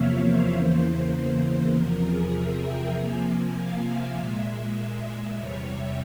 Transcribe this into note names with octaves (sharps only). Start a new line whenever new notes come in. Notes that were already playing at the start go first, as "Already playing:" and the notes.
Already playing: E2 C3 F3 A#3 C#5 E5 F5
C5
E2 C#3 E3 A#3
E2 C3 F3 A#4
G#4
E5
G5
C3 F3 A#3 G#5
G#5
F5
E5
A#2 G#3
E2 C3 G3 C#5
E5